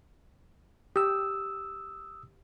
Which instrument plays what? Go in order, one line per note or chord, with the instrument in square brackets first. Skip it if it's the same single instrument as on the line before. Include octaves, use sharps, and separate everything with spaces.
[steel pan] G4 [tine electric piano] D#6 E6